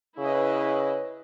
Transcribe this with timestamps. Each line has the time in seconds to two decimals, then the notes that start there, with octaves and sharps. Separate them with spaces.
0.19 C#3 E4 B4 D#5